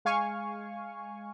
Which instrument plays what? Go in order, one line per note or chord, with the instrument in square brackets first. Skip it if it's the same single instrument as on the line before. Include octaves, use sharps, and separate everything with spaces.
[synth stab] G#3 F5 G#5 C#6